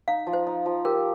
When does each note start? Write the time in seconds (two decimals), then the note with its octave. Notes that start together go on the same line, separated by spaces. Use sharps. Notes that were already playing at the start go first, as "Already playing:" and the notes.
0.08 D#4 F5
0.27 F3
0.33 C5
0.47 D#4
0.66 F3
0.85 G4 A#4